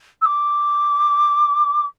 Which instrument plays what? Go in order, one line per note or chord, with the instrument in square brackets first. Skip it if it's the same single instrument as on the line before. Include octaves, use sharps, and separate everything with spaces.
[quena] E6
D6